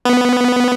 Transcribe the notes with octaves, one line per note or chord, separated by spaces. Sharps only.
B3